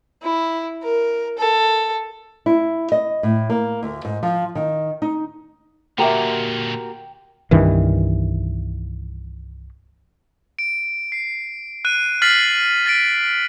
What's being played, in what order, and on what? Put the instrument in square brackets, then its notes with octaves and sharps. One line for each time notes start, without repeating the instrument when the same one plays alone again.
[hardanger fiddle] E4
A#4
A4
[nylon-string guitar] E4
D#5
A2
A#3
D2
G#2
F3
D#3
D#4
[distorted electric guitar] A#2 D3 [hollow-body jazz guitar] A#3 G4 E5 [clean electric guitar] F#4 A#4 [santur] G5
[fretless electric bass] C2 G2 D#3 E3
[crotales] D7
C7
F#6 D#7
F6 A6 B6 C7 F#7 G7
A6 B6 D7